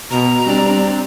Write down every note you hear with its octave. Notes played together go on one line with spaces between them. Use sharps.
B2 A#5
G3 C4 D4 D5